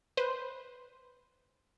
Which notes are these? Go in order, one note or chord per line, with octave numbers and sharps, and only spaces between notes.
B4 C5